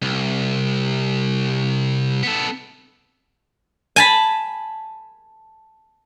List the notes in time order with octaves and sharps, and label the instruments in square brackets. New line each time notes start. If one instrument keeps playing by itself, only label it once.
[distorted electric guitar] C2
B3 A4
[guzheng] G#5 A5 B5